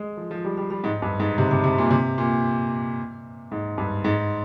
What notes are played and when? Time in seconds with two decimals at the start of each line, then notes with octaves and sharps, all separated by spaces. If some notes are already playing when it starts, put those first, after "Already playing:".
Already playing: G#3
0.17 F3
0.31 F3
0.45 G3
0.57 G3
0.70 G3
0.84 G#2
1.02 G2
1.20 G#2
1.38 C3
1.51 C3
1.64 C3
1.78 A#2
1.91 C3
2.18 A#2
3.52 G#2
3.78 G2
4.04 G#2